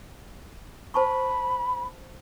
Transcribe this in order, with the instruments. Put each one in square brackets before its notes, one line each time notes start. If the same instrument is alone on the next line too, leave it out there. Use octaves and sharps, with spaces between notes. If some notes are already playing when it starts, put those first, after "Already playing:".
[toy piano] C5 A5 C#6 [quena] B5